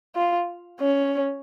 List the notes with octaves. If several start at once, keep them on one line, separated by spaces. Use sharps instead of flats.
F4
C#4